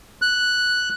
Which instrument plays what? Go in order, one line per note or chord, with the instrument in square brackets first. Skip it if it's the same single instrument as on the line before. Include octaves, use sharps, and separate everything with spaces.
[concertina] F#6